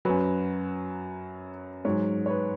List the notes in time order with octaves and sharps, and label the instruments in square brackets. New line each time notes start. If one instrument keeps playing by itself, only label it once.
[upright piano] F#2 F#3 B4
G#2 F#3 C#5
C#5
B4